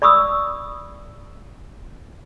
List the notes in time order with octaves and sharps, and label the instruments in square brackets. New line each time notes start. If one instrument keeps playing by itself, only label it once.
[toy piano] D5 B5 C#6 D#6 E6